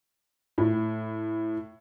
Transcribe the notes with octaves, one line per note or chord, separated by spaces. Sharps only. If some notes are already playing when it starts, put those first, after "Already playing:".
A2